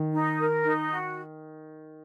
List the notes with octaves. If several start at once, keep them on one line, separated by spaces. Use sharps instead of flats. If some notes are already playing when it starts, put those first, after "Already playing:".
Already playing: D#3
D#4
A#4
D#4
F#4